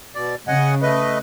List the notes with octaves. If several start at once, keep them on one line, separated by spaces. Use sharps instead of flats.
B2 D5
C#3 D#5 F#5 G#5
A3 B4 D#5